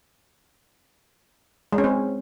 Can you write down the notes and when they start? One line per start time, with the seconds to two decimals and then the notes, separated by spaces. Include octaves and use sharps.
1.73 G#3
1.78 C#4
1.84 C4